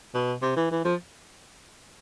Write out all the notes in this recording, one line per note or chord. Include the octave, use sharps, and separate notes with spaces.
B2
C3
E3
E3
F3